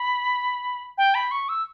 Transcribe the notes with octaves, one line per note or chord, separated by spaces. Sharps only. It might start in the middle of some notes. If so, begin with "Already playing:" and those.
Already playing: B5
G5
B5
C#6
E6